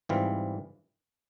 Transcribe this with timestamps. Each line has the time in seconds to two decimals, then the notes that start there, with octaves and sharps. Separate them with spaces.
0.09 G#2 E3 G3 C4 F4